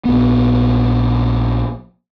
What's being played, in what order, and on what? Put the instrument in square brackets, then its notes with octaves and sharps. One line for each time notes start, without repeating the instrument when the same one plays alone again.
[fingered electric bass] A#1 B3